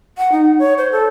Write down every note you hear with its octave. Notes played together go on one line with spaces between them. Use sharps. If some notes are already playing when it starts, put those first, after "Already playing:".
F#5
D#4
C#5
C5
A4